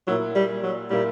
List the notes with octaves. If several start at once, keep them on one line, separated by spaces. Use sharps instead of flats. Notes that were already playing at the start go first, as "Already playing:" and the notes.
A#2 F#3 A#3 E4
G3
F#3
A#2 G3 A#3 E4